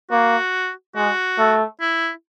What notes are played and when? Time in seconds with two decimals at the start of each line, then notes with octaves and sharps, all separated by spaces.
0.11 A#3 F#4
0.96 G#3 F#4
1.38 A3
1.80 E4